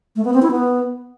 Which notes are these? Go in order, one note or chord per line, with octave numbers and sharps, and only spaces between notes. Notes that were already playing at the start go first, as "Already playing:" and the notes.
A3
B3
C4
E4
B3